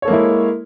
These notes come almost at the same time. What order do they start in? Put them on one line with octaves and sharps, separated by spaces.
C#5 A4 A#3 G#3 E4